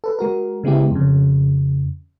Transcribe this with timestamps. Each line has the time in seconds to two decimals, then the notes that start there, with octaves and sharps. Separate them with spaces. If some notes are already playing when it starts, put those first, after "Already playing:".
0.04 A4 B4
0.19 G#3 F#4 A#4
0.64 C#3 G#3 B3 E4 G4
0.91 F2 C#3